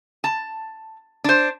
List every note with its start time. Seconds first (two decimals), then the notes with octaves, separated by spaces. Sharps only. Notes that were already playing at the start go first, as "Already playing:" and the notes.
0.24 A5
1.24 D4 C5